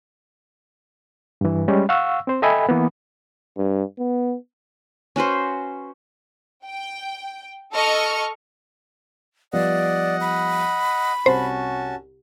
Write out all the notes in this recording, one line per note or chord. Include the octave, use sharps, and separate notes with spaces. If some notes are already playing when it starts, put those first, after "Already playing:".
G2 E3
G3 G#3 C#4
F5 F#5 C#6 E6
C4 C5
A4 D#5 E5 G5 G#5 B5
E3 A#3 B3
G2
B3
C#4 F#4 B4 C5
G5
A4 D#5 A5 C#6 F6
F3 G3 B3 D5 D#5 F#5
B5
C2 C#4 F#4 C5 A5